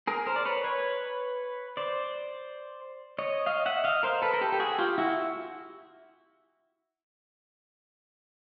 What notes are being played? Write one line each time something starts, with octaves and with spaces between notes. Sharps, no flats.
G#4 A#4
A#4 C5
D5
B4 C#5
B4 C#5
C5 D5
C#5 D#5
D#5 F5
E5 F#5
D#5 F5
A#4 C5
A4 B4
A#4
G4 A4
G4
F#4 G#4
F4 G4
E4 F#4